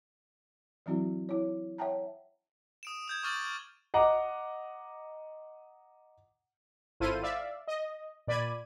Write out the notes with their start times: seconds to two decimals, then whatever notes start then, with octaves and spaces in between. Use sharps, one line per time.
0.86 E3 F#3 C4 E4 F#4
1.29 E4 C#5
1.78 C#5 E5 F#5 G5 A5 A#5
2.83 D#6 D7 E7
3.08 D#6 G6 G#6
3.23 C#6 D6 F6 A6 D#7 F#7
3.94 D#5 F#5 A#5 D6
7.00 G#1 E4 F4 A4 C5 D#7
7.22 D5 E5 F5
7.68 D#5
8.27 A#2 D5 B5 G#6 D#7